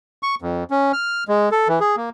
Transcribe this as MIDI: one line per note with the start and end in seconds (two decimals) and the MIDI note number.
0.23 0.35 85
0.42 0.64 41
0.71 0.92 61
0.93 1.24 89
1.28 1.49 56
1.52 1.68 69
1.68 1.79 52
1.80 1.96 68
1.96 2.10 58